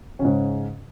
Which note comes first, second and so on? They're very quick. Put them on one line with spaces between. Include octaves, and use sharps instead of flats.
C#4 C#3 G#2